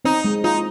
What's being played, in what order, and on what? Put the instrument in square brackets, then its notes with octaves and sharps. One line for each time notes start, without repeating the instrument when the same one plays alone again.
[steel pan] C4 [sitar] D#4
[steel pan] G#3
[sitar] D#4 [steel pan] F4